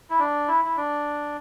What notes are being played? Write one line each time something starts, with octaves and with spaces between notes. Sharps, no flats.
E4
D4
E4
E4
D4